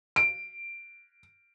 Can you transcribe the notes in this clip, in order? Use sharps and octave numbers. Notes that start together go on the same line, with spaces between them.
D7